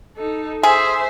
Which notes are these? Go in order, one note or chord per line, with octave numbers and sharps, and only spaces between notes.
D#4 A4
G#4 C5 E5